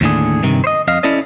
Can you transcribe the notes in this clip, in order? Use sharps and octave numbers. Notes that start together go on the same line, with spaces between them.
D#2 A2 D3 G#4
G2 C3 D#3
C5 D#5
F2 D#5 F5
C#4 E4 A4 D5 D#5